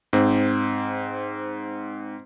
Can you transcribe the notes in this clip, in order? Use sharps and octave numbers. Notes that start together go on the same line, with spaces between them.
G#2 C4